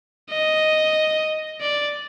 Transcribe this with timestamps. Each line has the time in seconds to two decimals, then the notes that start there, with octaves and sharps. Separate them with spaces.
0.30 D#5
1.61 D5